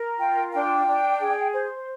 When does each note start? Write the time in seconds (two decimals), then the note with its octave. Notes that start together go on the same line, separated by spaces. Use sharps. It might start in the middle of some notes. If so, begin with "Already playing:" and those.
Already playing: A#4
0.19 F4 G5
0.53 D4 G5
0.86 D4
1.20 G#4
1.54 C5